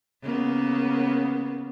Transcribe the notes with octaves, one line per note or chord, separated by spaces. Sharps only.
C#3 A#3 B3